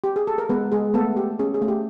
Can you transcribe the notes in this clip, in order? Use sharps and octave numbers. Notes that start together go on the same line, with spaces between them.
G4
G#4
A4
A#4
G#3 B3 B4
G#3 G#4
A3 B3 A4
G4
C#4 G#4
G#4
A3
G4